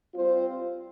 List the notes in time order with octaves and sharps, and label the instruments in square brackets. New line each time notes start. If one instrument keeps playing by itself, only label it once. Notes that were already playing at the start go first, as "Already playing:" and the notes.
[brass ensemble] G3 C4 F4 C5